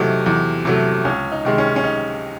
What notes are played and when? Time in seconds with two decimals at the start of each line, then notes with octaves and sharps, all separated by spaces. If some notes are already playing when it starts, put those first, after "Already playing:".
Already playing: E2 C3 F#3 A3 D#4
0.26 E2
0.65 C3 F#3 A3
1.05 C#2 C#4
1.32 D#4
1.45 C3 D#3 G#3
1.58 C#4
1.76 C#4
1.84 D#4